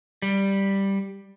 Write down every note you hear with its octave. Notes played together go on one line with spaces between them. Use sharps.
G3